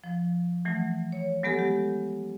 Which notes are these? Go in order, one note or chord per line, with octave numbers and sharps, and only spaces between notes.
F3
E3 F#3 A3
C#5
F#3 G#3 B3 G4 A4
G4